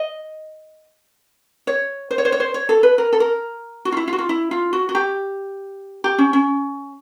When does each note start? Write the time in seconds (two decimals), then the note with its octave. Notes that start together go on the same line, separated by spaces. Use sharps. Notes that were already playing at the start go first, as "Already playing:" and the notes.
Already playing: D#5
1.67 C#5
2.11 C5
2.18 C#5
2.25 C5
2.32 C#5
2.40 C5
2.54 C#5
2.69 A4
2.83 B4
2.98 A#4
3.13 A4
3.20 A#4
3.85 F#4
3.92 F4
3.97 E4
4.08 F4
4.13 F#4
4.19 F4
4.29 E4
4.51 F4
4.73 F#4
4.89 F#4
4.95 G4
6.04 G4
6.18 C#4
6.33 C#4